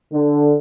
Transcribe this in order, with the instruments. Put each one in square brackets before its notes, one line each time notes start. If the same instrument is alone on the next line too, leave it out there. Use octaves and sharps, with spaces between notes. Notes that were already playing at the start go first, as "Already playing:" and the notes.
[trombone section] D3